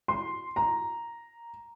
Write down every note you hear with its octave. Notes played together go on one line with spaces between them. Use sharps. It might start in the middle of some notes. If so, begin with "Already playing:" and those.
C6
A#5